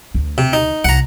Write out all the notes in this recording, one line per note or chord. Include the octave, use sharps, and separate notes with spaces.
D2
C3
D#4
C2 F#5 A#5